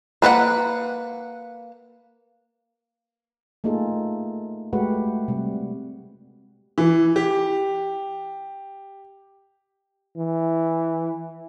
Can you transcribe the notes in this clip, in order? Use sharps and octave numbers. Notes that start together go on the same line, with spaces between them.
A#3 B4 D#5 F#5
A3 A#3 D#4 F4 G#4 A4
G#3 A3 F#4 G4 B4 F#5
C3 G3
E3
G4
E3